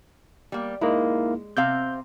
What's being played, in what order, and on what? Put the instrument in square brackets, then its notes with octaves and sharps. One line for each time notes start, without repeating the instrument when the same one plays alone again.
[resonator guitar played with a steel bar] G3 A#3
[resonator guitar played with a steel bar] G#3 [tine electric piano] A#3 D#4 E4
[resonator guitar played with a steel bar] C3 C4 F5 [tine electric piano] G6